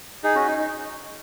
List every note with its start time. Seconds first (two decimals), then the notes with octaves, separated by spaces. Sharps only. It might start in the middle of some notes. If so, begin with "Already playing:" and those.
0.24 D#4 G#4
0.35 C#4 F#4
0.47 D#4
0.58 D#4